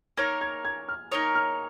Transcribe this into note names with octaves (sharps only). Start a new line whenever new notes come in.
A#3 D#4 A#4 C#5 G#6
G#6
G#6
F6
A#3 D#4 A#4 C#5 D#6
F6